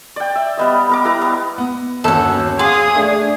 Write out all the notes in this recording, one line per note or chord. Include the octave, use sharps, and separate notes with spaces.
D5 G5
E5
G3 B3 D#5
B3 A#4 D6
G3 E4 B4 A#5
B3
B3
G1 D#2 C#4 F#4 A4 F#5 E6
G#4 F5 F#5 C6 D6 D#6
A3 D4